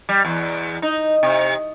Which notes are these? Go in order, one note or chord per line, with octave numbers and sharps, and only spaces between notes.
G3
E2
D#4
C3